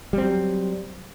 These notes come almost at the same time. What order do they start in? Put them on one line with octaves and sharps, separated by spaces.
G3 C4 F#3